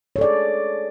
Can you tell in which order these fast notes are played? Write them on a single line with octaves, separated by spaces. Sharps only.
C#5 A4 D5 G#4